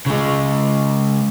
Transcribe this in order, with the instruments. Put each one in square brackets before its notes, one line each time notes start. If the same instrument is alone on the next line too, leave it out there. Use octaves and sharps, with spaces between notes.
[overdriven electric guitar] C#3 G#3